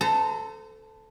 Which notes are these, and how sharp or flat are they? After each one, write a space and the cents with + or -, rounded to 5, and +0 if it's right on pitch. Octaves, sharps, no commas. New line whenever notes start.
A4 +0 C5 -40 A#5 -30